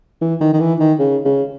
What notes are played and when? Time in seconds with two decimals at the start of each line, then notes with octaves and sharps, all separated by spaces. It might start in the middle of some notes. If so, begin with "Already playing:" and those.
0.22 E3
0.41 D#3
0.53 D#3
0.60 E3
0.80 D#3
0.99 C#3
1.25 C#3